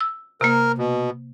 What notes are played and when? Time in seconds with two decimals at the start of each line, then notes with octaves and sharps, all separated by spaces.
0.01 E6
0.41 C3 A#3 A#4
0.78 B2